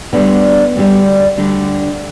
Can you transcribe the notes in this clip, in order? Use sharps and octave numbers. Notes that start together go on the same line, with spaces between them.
D2 D3 G3 B3
D2 D3 G3
D2 D3 G3 D4